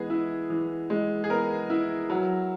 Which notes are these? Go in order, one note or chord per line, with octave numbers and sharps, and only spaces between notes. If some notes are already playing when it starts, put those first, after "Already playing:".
Already playing: E3 G#3 B3 G#4
E4
E3
G#3
G#4
B3 A#4
E4
F#3